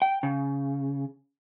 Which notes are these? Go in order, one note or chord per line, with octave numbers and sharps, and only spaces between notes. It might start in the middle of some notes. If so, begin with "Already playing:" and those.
G5
C#3